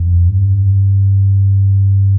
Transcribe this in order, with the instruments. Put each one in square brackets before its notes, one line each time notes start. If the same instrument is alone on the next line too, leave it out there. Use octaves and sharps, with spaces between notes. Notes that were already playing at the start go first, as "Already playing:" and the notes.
Already playing: [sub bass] F2
G2